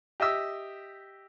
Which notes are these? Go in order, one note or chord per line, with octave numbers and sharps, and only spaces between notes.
G4 D#5 E5 E6